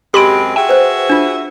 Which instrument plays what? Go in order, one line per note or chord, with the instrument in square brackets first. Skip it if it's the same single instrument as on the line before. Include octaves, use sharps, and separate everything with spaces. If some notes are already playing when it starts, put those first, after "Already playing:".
[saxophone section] F#2 G#3 C4 [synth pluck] G4 B5 D7 [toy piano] C6
[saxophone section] F#4 G#4 E5 [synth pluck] G5
[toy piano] B4 C5
D4 F4